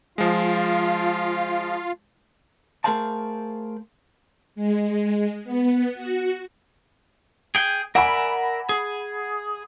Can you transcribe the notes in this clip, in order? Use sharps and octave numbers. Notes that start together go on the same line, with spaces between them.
F3 G#3 F4 F5
A3 G#4 A#4 C5 F5 A5
G#3
B3
F#4
G#4 G5
A#4 D5 E5 F#5 G#5 B5
G#4